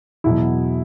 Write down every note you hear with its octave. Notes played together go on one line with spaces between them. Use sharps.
E2 B2 F#3 E4